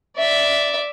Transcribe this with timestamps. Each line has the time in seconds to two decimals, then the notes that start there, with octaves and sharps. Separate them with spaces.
0.17 D5 E5